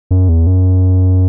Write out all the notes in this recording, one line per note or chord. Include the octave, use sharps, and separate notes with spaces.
F#2
E2
F#2